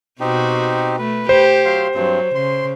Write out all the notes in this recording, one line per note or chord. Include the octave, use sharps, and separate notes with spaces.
B2 C4 D#4 F#4 G4
A3 B4
G4 C5
F#3 F5 C6
G2 F#3 C4
C#3 C6